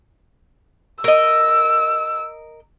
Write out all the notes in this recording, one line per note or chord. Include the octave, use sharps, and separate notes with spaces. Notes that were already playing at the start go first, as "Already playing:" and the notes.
A#4 D#5 E6